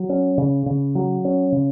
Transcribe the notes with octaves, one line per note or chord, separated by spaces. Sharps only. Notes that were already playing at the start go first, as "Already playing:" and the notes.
Already playing: F#3
C#4
C#3
C#3
F#3
C#4
C#3